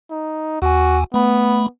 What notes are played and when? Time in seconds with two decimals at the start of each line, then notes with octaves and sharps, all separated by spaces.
0.10 D#4
0.62 D#2 F#4 G#5
1.14 A3 B3 B5